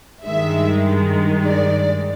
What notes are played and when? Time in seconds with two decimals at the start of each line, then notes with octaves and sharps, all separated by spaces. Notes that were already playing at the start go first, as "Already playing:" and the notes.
0.25 G2 D#3 G#3 E5
1.46 D5